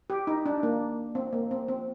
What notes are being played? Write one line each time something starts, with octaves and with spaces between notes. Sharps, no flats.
G4
D#4
D4
A#3
C4
A#3
C4
C4